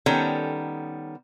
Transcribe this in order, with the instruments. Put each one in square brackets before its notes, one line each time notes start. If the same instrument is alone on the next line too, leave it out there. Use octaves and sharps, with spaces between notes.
[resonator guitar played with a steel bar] D#3 G3 B3 C#4 A4